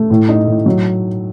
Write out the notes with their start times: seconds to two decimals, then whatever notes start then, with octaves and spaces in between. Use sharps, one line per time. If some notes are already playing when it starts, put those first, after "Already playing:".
Already playing: A3
0.10 A2
0.29 D#4
0.48 A2
0.66 F#3